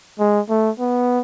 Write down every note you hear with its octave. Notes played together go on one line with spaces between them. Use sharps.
G#3
A3
B3